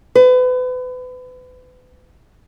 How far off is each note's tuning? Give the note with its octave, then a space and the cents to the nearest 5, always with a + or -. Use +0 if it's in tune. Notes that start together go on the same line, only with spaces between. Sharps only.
B4 +35